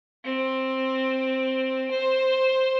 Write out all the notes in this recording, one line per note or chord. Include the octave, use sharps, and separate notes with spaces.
C4
C5